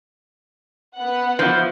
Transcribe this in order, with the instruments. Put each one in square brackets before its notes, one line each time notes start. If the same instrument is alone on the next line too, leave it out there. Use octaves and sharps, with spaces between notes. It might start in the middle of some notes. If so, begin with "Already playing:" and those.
[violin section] B3 F#5
[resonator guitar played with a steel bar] F3 [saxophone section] E4 F#4 C5